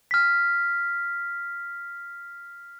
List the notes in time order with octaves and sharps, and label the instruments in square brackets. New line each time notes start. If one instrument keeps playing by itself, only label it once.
[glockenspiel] F6 B6